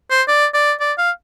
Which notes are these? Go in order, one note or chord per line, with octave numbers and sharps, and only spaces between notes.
C5
D5
D5
D5
F5